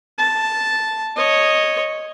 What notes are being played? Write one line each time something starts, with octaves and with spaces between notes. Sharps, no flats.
A5
C#5 D#5